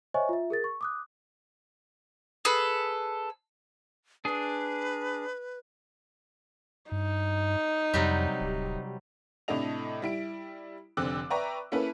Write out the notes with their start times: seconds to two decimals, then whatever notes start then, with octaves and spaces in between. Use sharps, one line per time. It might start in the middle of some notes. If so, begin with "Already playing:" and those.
0.14 C5 C#5 D#5 E5 G#5 C#6
0.29 F4 E5
0.50 G#4 A#4 A6
0.64 C#6
0.81 D6 D#6 F#6
2.45 G#4 A4 B4
4.25 D4 G#4 B4
6.92 G2 D#4
7.94 F2 C3 F#3 G3
8.40 D1
9.48 A2 C3 D4 A4 D#5 F7
10.02 G3 E4 D7
10.97 F1 D3 C4 D6 E6 F#6
11.30 B4 D5 E5 G5 A#5 C#6
11.72 A#3 C#4 E4 A4 B4